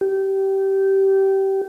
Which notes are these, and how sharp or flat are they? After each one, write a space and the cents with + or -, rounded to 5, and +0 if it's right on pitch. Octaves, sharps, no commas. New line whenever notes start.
G4 -20